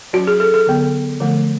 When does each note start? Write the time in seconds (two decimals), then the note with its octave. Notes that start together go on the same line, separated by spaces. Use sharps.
0.13 F#3 C#4 F#4
0.27 G#4
0.40 A4
0.54 A4
0.67 D3 F#3 B3
1.20 D3 F3 A3